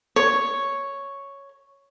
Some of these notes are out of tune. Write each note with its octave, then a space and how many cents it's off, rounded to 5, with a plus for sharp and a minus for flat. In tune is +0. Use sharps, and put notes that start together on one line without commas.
C#5 +0